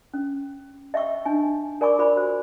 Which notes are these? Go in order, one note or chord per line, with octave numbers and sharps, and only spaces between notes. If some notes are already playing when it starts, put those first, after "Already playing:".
C#4
D#5 E5 G5 C#6 E6
D4 D#4 G#5
A#4 D5 G#5 B5 C#6 D6
F4 A#4 C5 D5 B5
F#4 C5